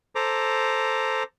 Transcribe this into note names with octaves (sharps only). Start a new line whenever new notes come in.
A4 C5 A#5 D6